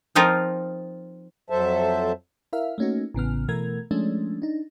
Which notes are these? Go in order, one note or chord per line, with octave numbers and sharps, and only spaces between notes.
F3 C4 D#4 F4 A#4
F2 F#3 A4 C5 E5 A5
E4 A#4 E5 F5
A3 A#3 C#4 D#4 F#4
A1 C#3 B3 F6
B2 E3 A3 A#4 G#6
F3 G#3 A3 C#4 D4
D4 D#4